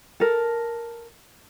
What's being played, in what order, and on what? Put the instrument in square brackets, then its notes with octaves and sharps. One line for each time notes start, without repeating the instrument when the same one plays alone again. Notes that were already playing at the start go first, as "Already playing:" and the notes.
[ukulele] A4 A#4